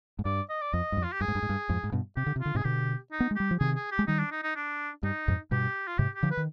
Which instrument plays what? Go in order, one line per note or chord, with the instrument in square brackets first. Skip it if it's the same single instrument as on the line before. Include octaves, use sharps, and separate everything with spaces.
[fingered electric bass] G#2
[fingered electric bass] G2 [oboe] D5
[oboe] D#5
D5
[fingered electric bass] F2 [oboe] D#5
[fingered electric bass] G2
F2
[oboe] F4
G4
[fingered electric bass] G2 [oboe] G#4
[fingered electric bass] G#2
G2
G#2
G2
F2 G#2
G#2
G2 B2
[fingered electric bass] C3 [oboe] G4
[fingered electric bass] D3
C3
[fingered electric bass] D3 [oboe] F4
[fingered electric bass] G#2 C3 [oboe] G#4
[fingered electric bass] B2 D3 [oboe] G4
[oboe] D#4
[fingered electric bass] B3
G#3
[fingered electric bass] G3 [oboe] G4
[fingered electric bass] F3
[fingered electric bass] C3 D#3 [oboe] G#4
[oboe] G#4
G4
[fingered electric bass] G#3
[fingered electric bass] D#3 G3 [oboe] D#4
[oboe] D4
D#4
D#4
D4
[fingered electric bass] G2 [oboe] D#4
[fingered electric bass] F2 G#2
[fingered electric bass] G2 B2 [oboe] G4
[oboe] F4
[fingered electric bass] G#2 C3 [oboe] G4
[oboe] G4
[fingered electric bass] D3 F3
[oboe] B4
[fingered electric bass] D#3